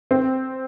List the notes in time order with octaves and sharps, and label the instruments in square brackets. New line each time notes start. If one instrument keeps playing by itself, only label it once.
[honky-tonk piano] C4